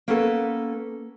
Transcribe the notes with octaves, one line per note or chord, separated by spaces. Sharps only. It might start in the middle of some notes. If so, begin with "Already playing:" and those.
A#3 B3 C#4 A4 B4